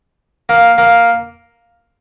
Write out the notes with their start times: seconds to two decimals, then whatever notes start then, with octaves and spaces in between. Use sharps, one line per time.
0.49 A#3
0.78 A#3